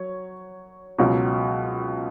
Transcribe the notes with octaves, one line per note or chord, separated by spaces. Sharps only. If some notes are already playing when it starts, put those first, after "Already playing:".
Already playing: F#3 C#5
C#2 B2 F#3